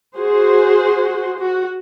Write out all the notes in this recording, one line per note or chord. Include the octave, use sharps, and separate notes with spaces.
F#4 G#4 C5
F#4